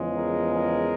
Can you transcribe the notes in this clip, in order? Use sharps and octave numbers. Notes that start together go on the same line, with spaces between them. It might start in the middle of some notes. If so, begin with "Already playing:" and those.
Already playing: E2 C#3 F3 G#3
G#4 A#4
G#4 A#4